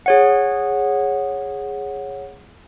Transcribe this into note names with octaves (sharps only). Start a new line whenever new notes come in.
G#4 C#5 F#5